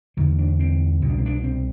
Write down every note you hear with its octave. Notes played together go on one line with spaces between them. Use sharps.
E2 D3 C4
D4
C4
C2 B2
D4
C4
D4
C4